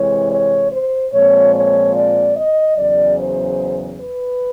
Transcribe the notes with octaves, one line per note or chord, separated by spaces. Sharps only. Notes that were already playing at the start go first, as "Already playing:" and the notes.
Already playing: C3 E3 G#3 C#5
C#5
C5
A#2 F3 G#3 C4 C#5
C#5
D5
D#5
E2 C#3 F#3 D5
C5
B4